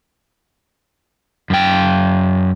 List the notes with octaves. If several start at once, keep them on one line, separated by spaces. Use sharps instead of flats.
F#2 G5